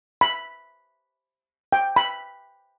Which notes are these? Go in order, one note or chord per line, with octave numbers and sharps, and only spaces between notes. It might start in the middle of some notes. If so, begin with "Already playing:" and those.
B5
G5
B5